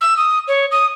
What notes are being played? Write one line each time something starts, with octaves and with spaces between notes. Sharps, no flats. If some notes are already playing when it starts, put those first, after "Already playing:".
E6
D#6
C#5
D#6